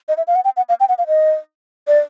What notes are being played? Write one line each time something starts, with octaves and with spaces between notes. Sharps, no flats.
D#5
E5
F5
F#5
G5
F#5
F5
G5
F#5
F5
D#5
D5